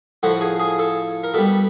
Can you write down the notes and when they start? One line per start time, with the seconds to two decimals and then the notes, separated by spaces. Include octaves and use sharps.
0.23 A2 F3 F#4
0.41 G#4
0.59 G#4
0.79 A4
1.24 A#4
1.34 B2 G3 A4